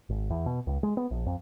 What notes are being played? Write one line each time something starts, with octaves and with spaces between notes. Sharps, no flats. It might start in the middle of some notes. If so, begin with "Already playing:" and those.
G#1
E2
B2
C#2
G#3
B3
A#1
F2